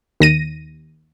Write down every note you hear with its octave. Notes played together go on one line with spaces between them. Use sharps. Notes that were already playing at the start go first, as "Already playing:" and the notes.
D#2 A#6 D#7